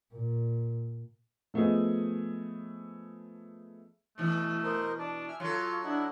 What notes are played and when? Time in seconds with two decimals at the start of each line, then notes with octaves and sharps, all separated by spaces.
0.13 A#2
1.54 F3 A3 B3 G#4 D#5
4.18 B2 E3 A3
4.63 A#4 C5 D#5
4.99 D4 A5
5.28 E5 G#5 F6
5.40 F#3 F4 A4 F5
5.84 D4 E4 D#5 F#5